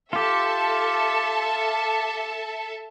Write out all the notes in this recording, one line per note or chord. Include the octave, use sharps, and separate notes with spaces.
F4 G4 A4 E5 A5